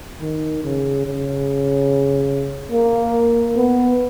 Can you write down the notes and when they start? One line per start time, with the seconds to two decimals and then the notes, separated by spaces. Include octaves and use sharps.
0.22 D#3
0.63 C#3
1.06 C#3
2.72 A#3
3.56 B3